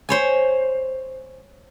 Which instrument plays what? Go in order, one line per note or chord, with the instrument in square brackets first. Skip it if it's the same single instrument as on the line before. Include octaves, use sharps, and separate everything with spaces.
[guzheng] C5 C#5 G#5